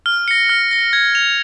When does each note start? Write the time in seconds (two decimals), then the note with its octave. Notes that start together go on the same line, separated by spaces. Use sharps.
0.06 F6
0.28 A#6 C#7
0.49 F6
0.71 A#6 C#7
0.93 G#6
1.15 F7